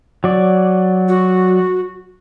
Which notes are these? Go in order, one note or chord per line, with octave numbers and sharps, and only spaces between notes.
F#3 D5
F#4